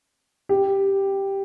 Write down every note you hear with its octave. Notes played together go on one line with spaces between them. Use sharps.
G4